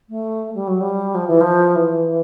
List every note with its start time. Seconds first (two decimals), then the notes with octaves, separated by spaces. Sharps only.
0.09 A3
0.54 G3
0.67 F#3
0.80 G3
1.14 F3
1.27 E3
1.40 F3
1.75 E3